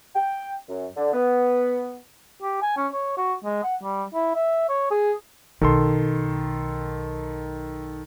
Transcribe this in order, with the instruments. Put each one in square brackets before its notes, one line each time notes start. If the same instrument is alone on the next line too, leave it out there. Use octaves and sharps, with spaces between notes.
[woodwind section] G5
F#2
D3
B3
[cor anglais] G4
G#5
C#4
C#5
F#4
G#3
F#5
G3
E4
E5
C#5
G#4
[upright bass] B1 [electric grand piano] D#3 A4 C6